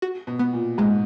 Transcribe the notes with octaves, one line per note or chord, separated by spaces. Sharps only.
F#4
B2
B3
A#2
G#2 G#3